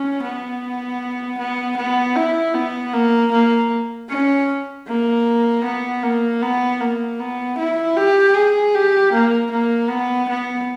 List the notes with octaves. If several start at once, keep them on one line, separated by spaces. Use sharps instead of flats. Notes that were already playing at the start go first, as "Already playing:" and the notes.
Already playing: C#4
B3
B3
B3
E4
B3
A#3
A#3
C#4
A#3
B3
A#3
B3
A#3
B3
E4
G4
G#4
G4
A#3
A#3
B3
B3